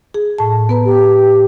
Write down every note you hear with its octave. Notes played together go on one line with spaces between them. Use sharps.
G#4
A2 A5
B3 B4 A#5
G4